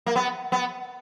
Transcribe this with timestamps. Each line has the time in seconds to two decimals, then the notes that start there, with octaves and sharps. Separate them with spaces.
0.06 A#3
0.16 B3
0.52 B3